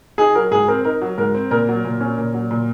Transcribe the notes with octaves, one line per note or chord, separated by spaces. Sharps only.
D#4 G#4
F#3 A#4
G#2 G#4
C4 A#4
D#4 A#4
F#3
G#2 A#4
C4
A#2 A#4
F#3
A#2
C#4
A#2
F#3
A#2